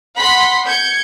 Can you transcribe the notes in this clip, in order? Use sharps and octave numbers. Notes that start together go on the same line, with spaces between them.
F#5 B5 C6 B6
G6 G#6 C#7